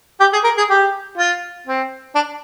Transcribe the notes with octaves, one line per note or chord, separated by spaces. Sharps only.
G4
G#4
A#4
G#4
G4
F4
C4
D4